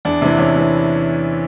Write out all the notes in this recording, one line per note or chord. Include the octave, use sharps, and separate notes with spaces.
E2 D4
C3 E3
E2 C#4
C3 E3